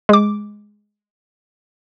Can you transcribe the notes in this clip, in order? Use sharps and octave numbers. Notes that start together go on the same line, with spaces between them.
G#3 D6